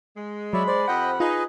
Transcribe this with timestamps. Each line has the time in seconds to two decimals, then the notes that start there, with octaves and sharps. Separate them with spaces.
0.16 G#3
0.53 F#3 C#5 D5 E5 B5
0.68 C5 D5
0.88 F2 G4 D#5 F#5 G5
1.20 D#4 F4 G#4 B4 D#5